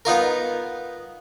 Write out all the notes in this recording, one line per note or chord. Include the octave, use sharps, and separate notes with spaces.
B3 D#4 F4 A#4